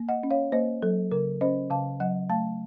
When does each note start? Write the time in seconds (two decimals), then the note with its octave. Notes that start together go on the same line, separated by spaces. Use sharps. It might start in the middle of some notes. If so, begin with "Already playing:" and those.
Already playing: A#3
0.09 D#5 F#5
0.23 C#4
0.30 C#5 F5
0.52 A#3 C5 D#5
0.82 F#3 A4
1.12 C#3 A#4
1.41 C#4 C5 D#5
1.71 C#3 F5 A5
2.00 F#3 D#5 F#5
2.30 A3 F5 A5